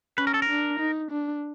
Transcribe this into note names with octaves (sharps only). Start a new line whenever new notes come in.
C#4 B4
A#4
A4
A#4
D4
D#4
D4